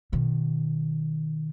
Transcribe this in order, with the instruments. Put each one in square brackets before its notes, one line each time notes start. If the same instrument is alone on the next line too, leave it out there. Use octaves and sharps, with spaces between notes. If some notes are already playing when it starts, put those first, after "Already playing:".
[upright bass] B2 D#3